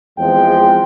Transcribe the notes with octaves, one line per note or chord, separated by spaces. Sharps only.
E2 F3 G#3 C4 G5